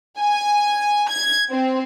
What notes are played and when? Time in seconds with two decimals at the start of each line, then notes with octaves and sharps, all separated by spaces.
0.19 G#5
1.09 G#6
1.50 C4